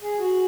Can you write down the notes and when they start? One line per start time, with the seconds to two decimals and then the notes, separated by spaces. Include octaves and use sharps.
0.02 G#4
0.19 F#4